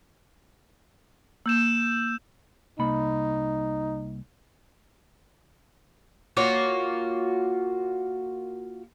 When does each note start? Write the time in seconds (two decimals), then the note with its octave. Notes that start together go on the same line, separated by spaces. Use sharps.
1.46 A#3 E6 G6 E7
2.79 C2 A#3 D#4 B5
6.37 A#3 F4 F#4 C#5